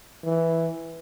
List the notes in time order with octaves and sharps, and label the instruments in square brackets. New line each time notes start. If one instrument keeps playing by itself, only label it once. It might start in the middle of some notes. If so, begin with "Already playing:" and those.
[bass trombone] E3